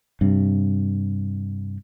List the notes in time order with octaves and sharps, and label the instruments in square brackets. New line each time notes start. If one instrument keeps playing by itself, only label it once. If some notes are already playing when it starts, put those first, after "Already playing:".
[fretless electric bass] G2 C3